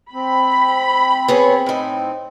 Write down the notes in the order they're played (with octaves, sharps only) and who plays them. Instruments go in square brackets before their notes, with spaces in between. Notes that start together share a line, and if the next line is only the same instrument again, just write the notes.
[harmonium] C4 [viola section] B5
[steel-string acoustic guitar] B3 G#4 C#5
A2 D#4